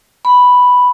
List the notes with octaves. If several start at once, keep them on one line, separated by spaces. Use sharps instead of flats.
B5